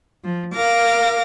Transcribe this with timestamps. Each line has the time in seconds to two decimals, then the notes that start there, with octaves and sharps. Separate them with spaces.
0.24 F3
0.55 A#4 F5 D6 A#6